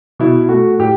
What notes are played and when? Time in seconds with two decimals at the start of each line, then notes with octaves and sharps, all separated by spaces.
0.19 B2 E4
0.49 A3 F#4
0.79 A2 G4